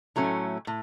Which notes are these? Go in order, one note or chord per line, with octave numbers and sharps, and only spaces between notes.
A2 F#3 A3 C#4
A2